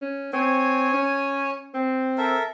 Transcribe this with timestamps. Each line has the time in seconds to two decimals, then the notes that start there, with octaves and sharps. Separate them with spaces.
0.02 C#4
0.33 C4 C#5 G#5
0.93 C#4
1.74 C4
2.18 A4 A#4 E5